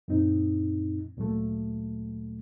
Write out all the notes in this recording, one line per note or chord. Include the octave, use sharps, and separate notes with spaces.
F#2 A#2 C4 D#4
D2 A#2 F#3 A3